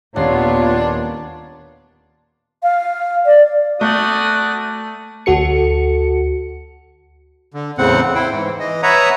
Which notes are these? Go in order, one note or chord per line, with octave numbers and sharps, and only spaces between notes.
D#1 A#2 B3 D4 F4 C#5 A#5 C7
F5
D5
A3 F#4 D5 D#6
D2 F#4 A4 C#7
D3
E2 A2 C#3 C4 F#5
E4 C5 G5
G#2 E3
E3 D#5
B4 C#5 E5 F#5 A#5 D#6